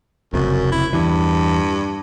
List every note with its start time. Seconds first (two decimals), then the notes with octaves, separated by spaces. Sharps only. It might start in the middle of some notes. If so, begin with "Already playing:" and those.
0.34 F1 C#2 F#2 C3
0.72 E4
0.93 E2 G2 E3